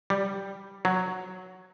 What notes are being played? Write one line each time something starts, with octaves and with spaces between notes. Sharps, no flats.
G3
F#3